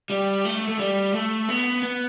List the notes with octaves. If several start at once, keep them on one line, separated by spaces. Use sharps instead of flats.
G3
A3
A3
G3
A3
B3
B3